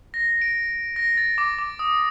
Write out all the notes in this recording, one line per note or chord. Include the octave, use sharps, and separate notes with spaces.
A#6
D7
A#6
A6
D6
D6
D#6